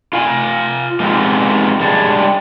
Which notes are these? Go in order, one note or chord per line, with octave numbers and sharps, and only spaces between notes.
F4 F5 G#5
G#3 B3 C4 D#4 F4 G4
G3 G#3 D4 G#4